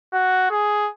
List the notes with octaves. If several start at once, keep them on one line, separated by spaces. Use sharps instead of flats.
F#4
G#4